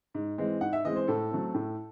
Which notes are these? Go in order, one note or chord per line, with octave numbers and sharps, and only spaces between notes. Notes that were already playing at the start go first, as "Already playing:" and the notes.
G#2
E3 G#3 C4
G#2 F#5
E5
E3 G#3 C4 D#5
C5
A2 A4
F#3 A3 C4
A2